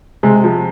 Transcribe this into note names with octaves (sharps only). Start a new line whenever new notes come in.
C3 G#3
F3